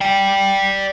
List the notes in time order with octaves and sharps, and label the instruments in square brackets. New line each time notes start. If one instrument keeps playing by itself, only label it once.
[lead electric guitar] D5 G5